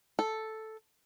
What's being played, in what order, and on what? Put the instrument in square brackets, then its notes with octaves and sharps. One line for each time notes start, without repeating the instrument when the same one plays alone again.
[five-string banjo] A4